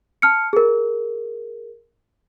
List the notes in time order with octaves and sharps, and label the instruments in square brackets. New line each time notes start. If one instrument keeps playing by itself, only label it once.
[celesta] A5 F6 C#7
G#4 A#4